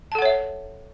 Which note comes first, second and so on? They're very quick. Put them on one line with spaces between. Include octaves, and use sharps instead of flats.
A5 A4 F#5 C#5 E5